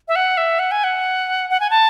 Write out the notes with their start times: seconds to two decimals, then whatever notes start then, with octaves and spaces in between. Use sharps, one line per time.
0.08 E5
0.16 F#5
0.37 E5
0.59 F#5
0.71 G#5
0.84 F#5
1.50 F#5
1.60 G#5
1.70 A5